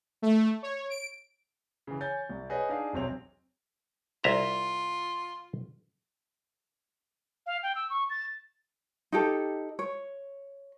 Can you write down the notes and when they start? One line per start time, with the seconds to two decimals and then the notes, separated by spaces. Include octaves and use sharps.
0.22 A3
0.63 C#5
0.90 D7
1.87 C#3 E3
2.01 C#5 G#5 G6 A6
2.29 C2
2.50 G#4 B4 C#5 D#5 F#5
2.69 D4 D#4 G#4 F5
2.93 E1 B1 C3 C4 C#5 F7
4.24 C2 F4 E5 A#5
7.46 F5
7.63 G5
7.75 E6
7.90 C#6
8.10 A6
9.12 D#4 G4 A4
9.79 C#5